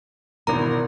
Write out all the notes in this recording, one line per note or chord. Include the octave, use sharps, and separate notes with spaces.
G#1 B2 E3 A#4 A#5